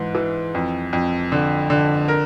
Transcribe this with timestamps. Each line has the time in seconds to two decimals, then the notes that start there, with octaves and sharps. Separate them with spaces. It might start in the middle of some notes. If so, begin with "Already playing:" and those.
Already playing: G#2 E3
0.15 E3
0.55 F2
0.93 F2
1.32 D3
1.70 D3
2.08 A#4